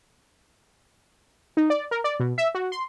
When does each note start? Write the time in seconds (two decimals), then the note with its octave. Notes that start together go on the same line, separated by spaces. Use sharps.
1.57 D#4
1.70 D5
1.91 A#4
2.04 D5
2.20 B2
2.38 E5
2.55 F#4
2.72 C6